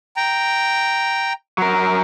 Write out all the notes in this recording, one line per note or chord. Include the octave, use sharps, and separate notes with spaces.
G5 A#5
F#3 A#4